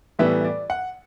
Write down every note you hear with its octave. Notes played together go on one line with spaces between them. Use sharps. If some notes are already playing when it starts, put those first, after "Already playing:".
A2 E3 G3 B3 E5
D5
F#5